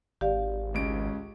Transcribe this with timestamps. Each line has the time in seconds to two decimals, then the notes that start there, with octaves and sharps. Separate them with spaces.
0.21 G#1 G4 D5 F5
0.74 C#2 C#4 D7